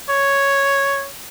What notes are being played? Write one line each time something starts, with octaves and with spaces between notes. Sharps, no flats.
C#5